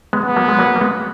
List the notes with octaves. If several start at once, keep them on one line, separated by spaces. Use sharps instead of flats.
G#3 B3
B3
F#3 A#3
G#3
F#3 A#3
A#3
G#3 B3